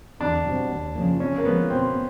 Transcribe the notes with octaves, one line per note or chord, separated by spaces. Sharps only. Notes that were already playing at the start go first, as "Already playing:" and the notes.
E2 D4
B2 G3 C4
D#2
C#3 F3 A#3
C#3 C#4
A#3
F3 G#3 B3
B2 C4
B3